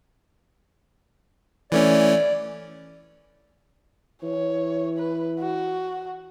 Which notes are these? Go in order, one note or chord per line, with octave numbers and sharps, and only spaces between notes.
E3 A3 C#4 D5
E3 C#5
B4
F#4